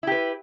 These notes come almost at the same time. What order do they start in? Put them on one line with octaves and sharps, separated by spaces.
E4 G4 B4